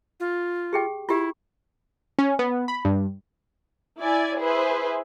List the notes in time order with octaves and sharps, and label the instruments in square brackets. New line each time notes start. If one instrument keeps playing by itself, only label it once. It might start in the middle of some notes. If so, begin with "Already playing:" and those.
[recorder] F4
[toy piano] G4 G#4 G5
[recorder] E4 [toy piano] F4 G4
[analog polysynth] C#4
B3
B5
G2
[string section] E4 D5 G#5 G#6
E4 G#4 B4 C5 E5